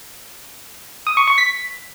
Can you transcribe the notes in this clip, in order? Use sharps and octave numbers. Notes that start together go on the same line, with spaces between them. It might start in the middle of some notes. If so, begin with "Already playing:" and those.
D#6
C#6
C#6
B6